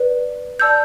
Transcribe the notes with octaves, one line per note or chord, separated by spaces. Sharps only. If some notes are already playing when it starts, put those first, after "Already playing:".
Already playing: B4 D5
D5 A5 E6 G6